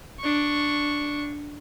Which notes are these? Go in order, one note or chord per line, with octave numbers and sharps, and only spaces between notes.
D4 C#6